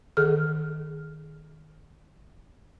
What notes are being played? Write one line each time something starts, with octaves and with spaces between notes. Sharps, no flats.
D#3 G#4 A4 F6